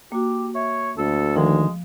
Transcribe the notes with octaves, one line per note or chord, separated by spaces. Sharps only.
A#3 F#4 G4
C#5 E5
D2 A4
D#3 F3 G#3